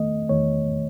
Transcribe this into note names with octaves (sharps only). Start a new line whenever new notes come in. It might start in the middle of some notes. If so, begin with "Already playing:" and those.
Already playing: E2 D#3 A3 D#5
E2 D#3 A3 C#5